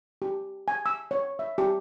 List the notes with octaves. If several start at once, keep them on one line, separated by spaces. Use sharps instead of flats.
G4
G#5
E6
C#5
E5
G4